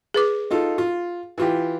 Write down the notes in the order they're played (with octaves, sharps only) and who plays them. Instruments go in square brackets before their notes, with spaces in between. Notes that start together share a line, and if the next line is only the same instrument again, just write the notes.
[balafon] G#4 B4 D6
[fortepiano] D#4 F4 A4
F4
E3 F4 G4